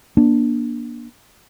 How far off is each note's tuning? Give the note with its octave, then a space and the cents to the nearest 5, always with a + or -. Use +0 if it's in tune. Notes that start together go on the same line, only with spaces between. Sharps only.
A#3 +40 D4 +0